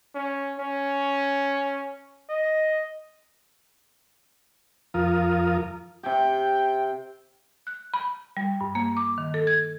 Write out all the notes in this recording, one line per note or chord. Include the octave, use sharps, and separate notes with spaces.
C#4
C#4
D#5
F2 F3 F4 A#4 D#6
C3 G4 G5
F#6
B5
G3
G2
A#3
D6
D#3
A4
G#6